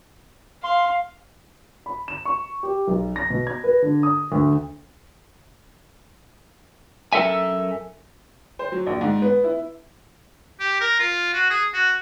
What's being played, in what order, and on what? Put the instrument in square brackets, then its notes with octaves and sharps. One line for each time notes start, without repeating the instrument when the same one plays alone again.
[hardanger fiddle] F5 [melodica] C6
[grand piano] B5
E7
C#6
G4
B1
A#6
B2
G#6
B4
D3
D#6
D2
[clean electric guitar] F#2 A4 A#4 E5 G#5
[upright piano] C5
F#3
A#1
G#2
B3
E4
[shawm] G4
A#4
F4
F#4
G#4
F#4